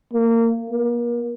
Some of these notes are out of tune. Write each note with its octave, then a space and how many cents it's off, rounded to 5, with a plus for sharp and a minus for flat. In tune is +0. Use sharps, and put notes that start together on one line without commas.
A#3 -25
A#3 +40